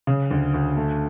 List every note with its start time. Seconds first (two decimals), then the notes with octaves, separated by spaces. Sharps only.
0.07 C#3
0.31 D2
0.54 D2
0.77 A3